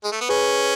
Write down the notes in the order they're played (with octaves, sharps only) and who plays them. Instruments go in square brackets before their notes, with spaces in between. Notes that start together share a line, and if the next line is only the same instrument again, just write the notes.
[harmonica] G#3
A3
B3
[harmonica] C#4 [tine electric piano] G#4 B4